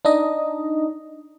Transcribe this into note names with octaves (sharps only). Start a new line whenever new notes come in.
D4 D#4 D#5